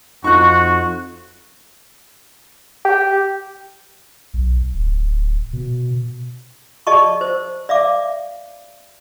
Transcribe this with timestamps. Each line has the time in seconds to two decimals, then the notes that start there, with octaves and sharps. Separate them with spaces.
0.24 F2 D#4 F4 F#4 C#6 F#6
2.85 G4
4.34 B1
4.73 D1
5.53 B2
6.87 G#4 D5 D#5 A5 C#6
7.21 C5
7.69 D5 E5 F5 D6